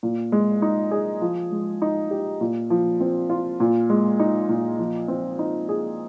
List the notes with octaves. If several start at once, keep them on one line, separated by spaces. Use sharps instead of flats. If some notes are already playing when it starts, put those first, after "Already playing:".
A#2
G#3
D#4
G#4
F3
G#3
D#4
G4
A#2
F3
C4
F4
A#2
G#3
D#4
A#2
F3
C4
D#4
G#4